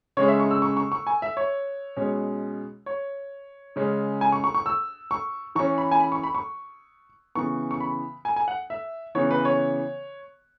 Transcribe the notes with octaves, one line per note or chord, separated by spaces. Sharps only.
C#3 G#3 C#4 C#5
E5
C#6
E6
C#6
C#6
C#6
G#5
E5
C#5
B2 G#3 C#4
C#5
C#3 G#3 C#4
G#5
C#6
C#6
C#6
E6
C#6
E3 C#4 C#6
B5
G#5
B5
C#6
B5
C#6
C#3 E3 B3 C#6
C#6
B5
G#5
G#5
F#5
E5
C#3 E3 B3 C#5
B4
C#5